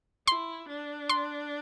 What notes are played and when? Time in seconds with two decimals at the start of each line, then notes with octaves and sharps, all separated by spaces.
0.27 E4 C6
0.68 D4
1.09 C6